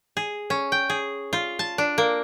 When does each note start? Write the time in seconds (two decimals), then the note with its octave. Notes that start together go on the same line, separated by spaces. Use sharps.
0.17 G#4
0.50 C#4
0.72 G5
0.90 G#4
1.33 F4
1.59 A5
1.78 D4
1.98 A#3